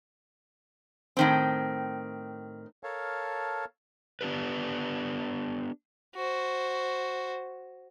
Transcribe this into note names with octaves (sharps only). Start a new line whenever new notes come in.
A2 D#3 C4
A4 A#4 C#5 F5 A5
B3 D4 G4 B4
F#4 C5